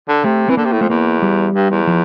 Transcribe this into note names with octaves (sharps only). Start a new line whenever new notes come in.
D3
C3 A3
E3 C4
D3 A#3
C3
A2
F2 A3
E2 A#3
G3
G2
E2
F3